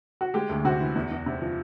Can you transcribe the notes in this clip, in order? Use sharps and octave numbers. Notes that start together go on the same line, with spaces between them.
F#4
G#3 G4
D2
C3 F#4
E3
E2
E2
C3
F3